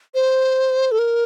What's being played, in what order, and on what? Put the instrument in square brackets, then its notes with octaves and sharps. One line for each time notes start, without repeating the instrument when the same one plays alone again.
[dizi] C5
A4
A#4